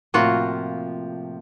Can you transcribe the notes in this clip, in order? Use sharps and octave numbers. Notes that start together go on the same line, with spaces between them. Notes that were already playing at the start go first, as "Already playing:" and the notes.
A2 C3 F3 A#3 F4 F#4